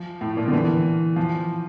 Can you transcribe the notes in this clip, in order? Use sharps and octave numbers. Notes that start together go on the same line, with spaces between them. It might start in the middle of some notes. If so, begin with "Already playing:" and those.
Already playing: F3
A2
A#2
D3
E3
F3